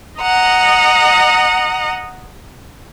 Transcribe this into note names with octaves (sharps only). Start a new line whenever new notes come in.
D#5 F#5 A#5